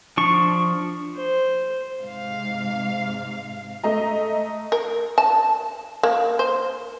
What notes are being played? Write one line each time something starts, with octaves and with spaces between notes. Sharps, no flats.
F3 D4 C#6
C5
G#2 C3 F5
A3 D#5 A#5
A#4
A5
A#3
C5